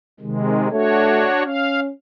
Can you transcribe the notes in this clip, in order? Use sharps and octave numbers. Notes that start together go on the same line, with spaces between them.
C3 D#3 G#3
A3 D4 F#4 C#5
C#4 F5